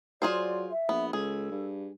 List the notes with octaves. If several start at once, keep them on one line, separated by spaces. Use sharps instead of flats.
F#3 F4 G#4 C5 D5
E5
A#1 B3
C#2 G#4 A4
G2